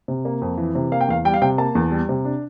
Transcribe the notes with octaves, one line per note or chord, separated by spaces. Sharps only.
C3
A#3
F2
E3
C3
A#3 F5
G5
E2 F5
G3 G5
F5
C3 G5
A#3 A5
E2
G3
C3
D4